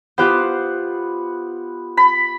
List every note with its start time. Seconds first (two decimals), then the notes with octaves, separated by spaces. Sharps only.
0.18 B3 F4 G4 C5 F#5
1.97 B5